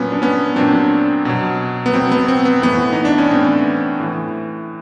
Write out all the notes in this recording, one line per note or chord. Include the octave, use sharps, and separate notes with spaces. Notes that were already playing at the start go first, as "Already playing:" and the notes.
Already playing: A#2 F#3 B3 C#4
D4
B3 C#4
A#2 F#3 C4 D4
B2 F#3
B3
B2 F#3 C4
B3
C4
B3
A2 E3 B3
D#4
D4
C#4
A2 E3 C4
A2 E3